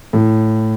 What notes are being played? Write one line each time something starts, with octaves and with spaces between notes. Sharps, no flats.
A2